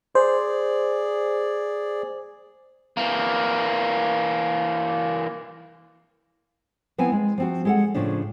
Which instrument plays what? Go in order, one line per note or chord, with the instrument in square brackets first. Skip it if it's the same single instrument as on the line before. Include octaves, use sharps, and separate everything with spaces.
[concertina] G#4 D5 [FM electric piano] C5
[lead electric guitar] E3 A#3
[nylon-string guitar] F3 B3 C4 E4 G#5
G#3
F3 C4 F#4
G#3 A4 F#5
A2 C#3 F3 D4